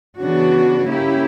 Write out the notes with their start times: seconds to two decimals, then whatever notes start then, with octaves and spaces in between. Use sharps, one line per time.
0.17 C#3 E3 B3 D4 F#4
0.86 A#3 C#4 E4 G4